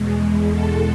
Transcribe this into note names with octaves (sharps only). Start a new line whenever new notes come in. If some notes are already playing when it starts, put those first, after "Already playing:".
Already playing: E2 B2 G#3
A4